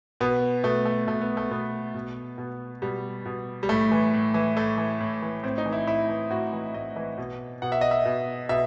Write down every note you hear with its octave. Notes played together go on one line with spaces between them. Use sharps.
B2 B3
B2 A3
A3
B2 A3
B3
A3
B2 B3
B2
B2
B2 G3
B2
G3
A2 A3
E3
A2
E3
A2 A3
E3
A2
E3
A2 C4
D#4
E3
E4
A2 E4
E3
A2 F#4
E3
A2 D#5
E3
B2
B2 F#5
E5
D#5
E5
B2
B2 E5